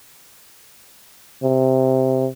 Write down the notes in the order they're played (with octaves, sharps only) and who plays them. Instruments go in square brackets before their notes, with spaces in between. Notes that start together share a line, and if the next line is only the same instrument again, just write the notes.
[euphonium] C3